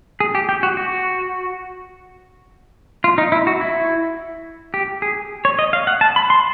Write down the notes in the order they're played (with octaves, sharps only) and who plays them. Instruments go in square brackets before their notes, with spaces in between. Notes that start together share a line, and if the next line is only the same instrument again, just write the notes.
[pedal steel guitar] G#4
G4
G4
F#4
F#4
F4
D#4
E4
F#4
E4
G4
G#4
C#5
D#5
F5
F#5
A5
B5
C6